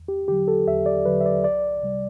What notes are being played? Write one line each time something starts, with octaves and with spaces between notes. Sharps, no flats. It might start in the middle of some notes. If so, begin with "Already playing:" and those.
Already playing: E2
G4
D3 F#3 G4
A4
E2 E5
D5
D3 F#3 B4
E5
D5
C2 D5
C3 G3